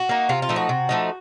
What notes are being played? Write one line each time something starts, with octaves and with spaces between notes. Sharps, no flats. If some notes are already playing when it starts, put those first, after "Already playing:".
Already playing: F#4
A#3 D#4
C3 F4
F4
F3 A3 D#4
F#4
C3
F3 A3 D#4